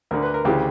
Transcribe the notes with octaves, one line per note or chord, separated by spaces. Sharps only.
D2 D3 A#4
B4
A#4
D2 C#3 E3 G4